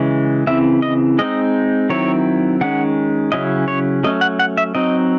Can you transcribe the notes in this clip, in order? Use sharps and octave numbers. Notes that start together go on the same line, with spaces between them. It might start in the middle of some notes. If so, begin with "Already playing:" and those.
Already playing: C#3 E3 G#3
C#3 E3 C4 E4 E5
D#5
G#3 C4 D#4 D#5
D#3 F#3 C4 E4 C#5
D#3 G#3 C#4 F#5
C#3 F#3 C#4 E4 D#5
C#5
F#3 A3 C#4 D#5
F#5
F#5
E5
F#3 C4 D#4 D#5